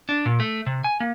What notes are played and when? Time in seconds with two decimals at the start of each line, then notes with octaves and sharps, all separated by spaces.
0.09 D4
0.26 A#2
0.40 A3
0.66 C3
0.84 G#5
1.00 A#3